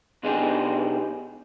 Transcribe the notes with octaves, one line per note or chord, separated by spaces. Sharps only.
B2 G#3 D4 D#4 G4 G#4